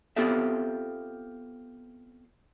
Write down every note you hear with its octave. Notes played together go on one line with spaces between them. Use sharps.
B3 C4 F4 G4 A4 E5